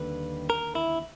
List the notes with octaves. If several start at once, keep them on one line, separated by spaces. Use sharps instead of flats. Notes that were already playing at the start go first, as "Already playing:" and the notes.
Already playing: D#2 D3 G3 B4
A#4
E4